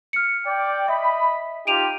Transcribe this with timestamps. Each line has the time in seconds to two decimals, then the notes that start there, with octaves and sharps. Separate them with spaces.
0.13 F6 C#7
0.45 D5 G5
0.88 D#5 E5 B5
1.67 D#4 F4 G4 D7 D#7 F7